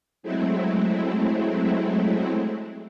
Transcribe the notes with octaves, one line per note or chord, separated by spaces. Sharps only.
F#3 G#3 A3 C4 E4